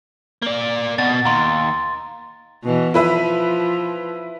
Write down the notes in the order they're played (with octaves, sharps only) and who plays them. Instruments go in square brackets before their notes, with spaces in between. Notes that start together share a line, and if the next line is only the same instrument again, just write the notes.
[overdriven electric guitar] A#3 D5
[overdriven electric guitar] B2 [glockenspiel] A6
[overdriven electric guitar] D#2 [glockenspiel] A#5 C6
[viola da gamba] B2 E3
[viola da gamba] F3 [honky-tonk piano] E4 B4 E5